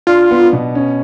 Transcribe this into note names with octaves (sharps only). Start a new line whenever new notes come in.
D4 F4
B3
B2
C#4